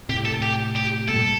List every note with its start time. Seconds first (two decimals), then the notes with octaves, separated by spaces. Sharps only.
0.09 A2 C3 G4
0.26 A4
0.42 G4
0.76 G4
1.08 G2 A#2 A4